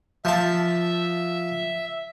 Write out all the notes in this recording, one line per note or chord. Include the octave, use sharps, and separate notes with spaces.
F3 E5 A5